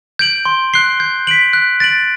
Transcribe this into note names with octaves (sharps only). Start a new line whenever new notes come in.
G6 D7 F#7
C6
F#6 C7 G7
G6
B6 D7 F#7
F#6
A6 D7 F#7